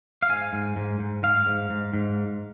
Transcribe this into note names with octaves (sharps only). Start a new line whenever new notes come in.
F5
G#2 G#5
G#2
G#2
G#2
G#2 F5
G#2
G#2
G#2